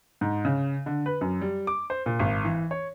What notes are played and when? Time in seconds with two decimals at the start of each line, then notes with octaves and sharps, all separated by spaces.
0.21 G#2
0.45 C#3
0.86 D3
1.06 B4
1.21 F#2
1.41 G3
1.67 D6
1.90 C5
2.06 A#2
2.19 G#1
2.45 E3
2.71 C#5